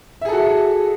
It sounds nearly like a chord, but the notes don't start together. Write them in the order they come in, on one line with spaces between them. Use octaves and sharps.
E5 G#4 A4 F#4